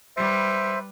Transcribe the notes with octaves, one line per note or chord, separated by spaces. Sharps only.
G3 B4 C5 E5